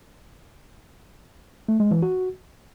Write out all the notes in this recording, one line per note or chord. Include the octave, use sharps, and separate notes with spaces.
A3
G#3
E3
F#4